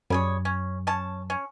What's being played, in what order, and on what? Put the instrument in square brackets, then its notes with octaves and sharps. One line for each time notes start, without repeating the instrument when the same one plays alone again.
[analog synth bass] F#2 [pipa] G3 G#4 C#5
[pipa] C#4
C#4 A5
C#4